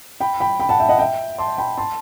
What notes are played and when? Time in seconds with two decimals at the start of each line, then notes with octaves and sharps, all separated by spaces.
0.20 G5 B5
0.40 G5 B5
0.60 G5 B5
0.69 F#5 A5
0.80 E5 G5
0.89 D#5 F#5
0.99 E5 G5
1.39 A5 C6
1.58 G5 B5
1.77 A5 C6